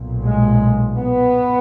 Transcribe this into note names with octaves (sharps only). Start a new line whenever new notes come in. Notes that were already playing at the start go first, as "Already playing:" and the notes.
Already playing: B1 A#2
G#3
B3